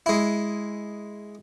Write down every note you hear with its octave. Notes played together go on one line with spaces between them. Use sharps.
G#3 E4